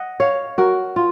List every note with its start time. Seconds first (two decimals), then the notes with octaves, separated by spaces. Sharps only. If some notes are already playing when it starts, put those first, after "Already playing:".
Already playing: D#5 F#5
0.20 C#5 F5
0.58 F#4 A#4
0.96 F4